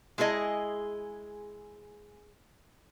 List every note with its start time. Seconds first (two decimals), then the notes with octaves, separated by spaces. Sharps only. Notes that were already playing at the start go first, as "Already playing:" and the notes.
0.18 G#3 E4 G#4 A4 D#5